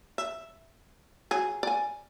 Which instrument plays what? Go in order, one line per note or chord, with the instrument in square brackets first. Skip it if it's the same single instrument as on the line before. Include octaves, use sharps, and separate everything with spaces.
[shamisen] E5
F#3 G#4
D5 G#5